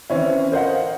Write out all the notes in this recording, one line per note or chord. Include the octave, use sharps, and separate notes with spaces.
E3 C4 C#4 E4
A#4 C5 D#5 F5 F#5